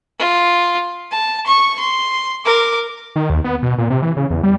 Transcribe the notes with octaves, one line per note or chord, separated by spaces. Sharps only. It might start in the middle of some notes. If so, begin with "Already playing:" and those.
F4
A5
C#6
C6
A#4 D6
D#3
D#2
B3
B2
A#2
C3
E3
C#3
E2
G3